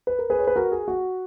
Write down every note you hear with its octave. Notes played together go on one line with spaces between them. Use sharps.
B4
A#4
G#4 B4
C#5
B4
F#4 A#4
G#4
F#4